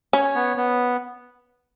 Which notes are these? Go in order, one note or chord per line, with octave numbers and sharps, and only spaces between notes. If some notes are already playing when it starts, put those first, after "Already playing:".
C#4 C#5
B3
B3